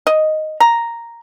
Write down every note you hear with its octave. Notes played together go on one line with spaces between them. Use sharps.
D#5
A#5